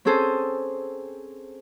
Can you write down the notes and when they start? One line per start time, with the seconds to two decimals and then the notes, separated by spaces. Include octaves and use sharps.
0.05 C4 C#4 G#4 A4 C5